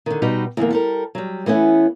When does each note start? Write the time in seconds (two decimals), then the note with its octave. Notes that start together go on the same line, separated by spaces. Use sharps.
0.06 D3 D#3
0.22 B2 G3 D#4 F#4 G4 B4
0.57 E2 D3 G3 A#3
0.71 G3 A4 A#4
1.15 F#3 G3
1.46 E3 A3 B3 C#4